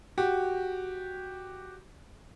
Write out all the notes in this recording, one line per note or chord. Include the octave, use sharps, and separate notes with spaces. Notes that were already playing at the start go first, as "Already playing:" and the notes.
F#4 G4